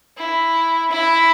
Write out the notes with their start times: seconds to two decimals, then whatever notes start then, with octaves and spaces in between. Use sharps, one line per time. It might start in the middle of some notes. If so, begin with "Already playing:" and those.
0.17 E4
0.91 E4